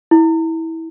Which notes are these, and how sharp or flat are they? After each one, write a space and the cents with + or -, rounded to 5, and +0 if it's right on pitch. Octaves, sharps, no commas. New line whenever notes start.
E4 -20